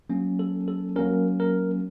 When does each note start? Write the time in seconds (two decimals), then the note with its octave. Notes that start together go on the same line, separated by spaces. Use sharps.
0.09 F#3 A#3 C#4
0.39 A4
0.68 A4
0.96 F#3 A#3 C#4 A#4
1.40 A#4